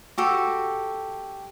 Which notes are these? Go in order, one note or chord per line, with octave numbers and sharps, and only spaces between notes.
F#4 G4 A4